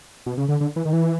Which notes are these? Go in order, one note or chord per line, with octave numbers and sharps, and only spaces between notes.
B2
C#3
D3
D3
E3
D#3
E3